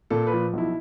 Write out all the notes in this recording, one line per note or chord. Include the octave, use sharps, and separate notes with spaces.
A#2 A4
F3 B4
B1 E4